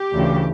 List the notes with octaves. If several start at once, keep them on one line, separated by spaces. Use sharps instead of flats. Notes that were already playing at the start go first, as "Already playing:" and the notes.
Already playing: G4
D2 C#3 E3